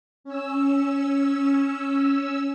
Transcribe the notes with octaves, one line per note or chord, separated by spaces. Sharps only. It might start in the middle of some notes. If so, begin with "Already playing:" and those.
C#4 E6